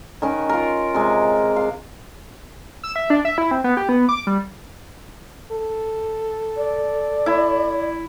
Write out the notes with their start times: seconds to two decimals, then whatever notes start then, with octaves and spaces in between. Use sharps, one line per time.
0.22 D#3 C#4 A#4 B4
0.49 F4 A#4
0.94 C3 G#3
1.56 F5
2.84 E6
2.96 E5
3.10 D4
3.25 E5
3.38 E4
3.51 C4
3.64 B3
3.77 G4
3.89 B3
4.09 D6
4.27 G3
5.52 A4
6.57 D5
7.26 E4 B5